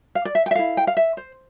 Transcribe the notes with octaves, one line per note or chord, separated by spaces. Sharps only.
F5
D5
E5
G5
E5
E4 A4 F5
G5
F5
E5
C5